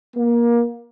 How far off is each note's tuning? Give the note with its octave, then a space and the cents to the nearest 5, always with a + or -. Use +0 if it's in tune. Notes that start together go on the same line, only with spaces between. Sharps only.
A#3 +20